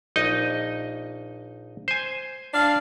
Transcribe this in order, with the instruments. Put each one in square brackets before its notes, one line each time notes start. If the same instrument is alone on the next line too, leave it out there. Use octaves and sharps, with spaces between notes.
[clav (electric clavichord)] A#1 D#4 D#5
C5 G#5
[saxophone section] D4 F5